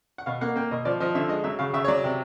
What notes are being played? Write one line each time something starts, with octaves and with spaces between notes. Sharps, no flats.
F#5
B2 F5
A#3 F#5
A#3 G5
B2 D#5
F3 D5
F3 D#5
D3 E5
G#3 D#5
F#3 E5
C#3 F5
C#3 E5
C#5
F#3 D5
C3